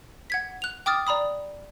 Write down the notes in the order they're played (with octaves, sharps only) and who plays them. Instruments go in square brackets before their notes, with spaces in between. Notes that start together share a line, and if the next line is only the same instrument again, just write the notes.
[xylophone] F#5 G#6 B6
F#6 F7
G5 D6 D#6 F6 A6
D5 A#5 B5 D#6